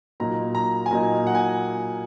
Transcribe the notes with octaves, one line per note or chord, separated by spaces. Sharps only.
A#2 F#3 A#3 D#4 A#5
A#5
G#5
A#2 F#3 A#3 D#4 A#5
F#5
G#5